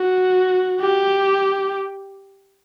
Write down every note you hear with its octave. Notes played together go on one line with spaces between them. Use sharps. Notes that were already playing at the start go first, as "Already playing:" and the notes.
Already playing: F#4
G4